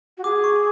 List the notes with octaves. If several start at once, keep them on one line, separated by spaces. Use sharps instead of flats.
F#4
G#4 D6
C#6